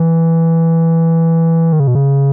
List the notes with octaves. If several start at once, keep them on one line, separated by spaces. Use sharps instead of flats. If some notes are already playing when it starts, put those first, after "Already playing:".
Already playing: E3
D#3
C#3
B2
C#3